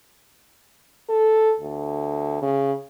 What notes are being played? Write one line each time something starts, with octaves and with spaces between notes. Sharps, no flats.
A4
D2
C#3